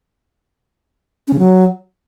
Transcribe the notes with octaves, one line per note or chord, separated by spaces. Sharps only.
C#4
C#3
F#3